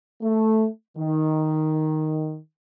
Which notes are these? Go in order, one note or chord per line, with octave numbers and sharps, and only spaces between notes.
A3
D#3